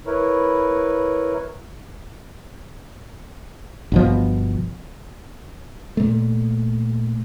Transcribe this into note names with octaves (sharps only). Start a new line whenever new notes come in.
E4 A#4 B4 C#5
G1 B2 F3
A#2 A3